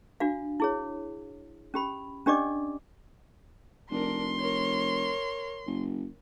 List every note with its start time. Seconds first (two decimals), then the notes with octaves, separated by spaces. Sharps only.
0.20 D4 F#4 F5
0.60 E4 G#4 C#5
1.74 C#4 G4 B5
2.26 C#4 D4 G4 D5 D#5 D6
3.91 F1 D4 A#4 C6
4.40 A#4 C#5
5.67 F#1